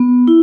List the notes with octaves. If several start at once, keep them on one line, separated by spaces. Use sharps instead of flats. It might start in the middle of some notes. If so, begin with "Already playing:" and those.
Already playing: B3
E4